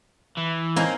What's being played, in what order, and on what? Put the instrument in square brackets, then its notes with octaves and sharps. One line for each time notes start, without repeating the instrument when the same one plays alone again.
[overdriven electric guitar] E3
[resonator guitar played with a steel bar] A#3 [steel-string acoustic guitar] C4 C#4 D#4